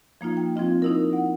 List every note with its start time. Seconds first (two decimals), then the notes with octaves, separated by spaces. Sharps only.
0.21 F3 A#3 D#4 F4
0.37 G5
0.56 F3 C4 F4 D#5
0.82 D#4 E4 A#4
1.13 F#5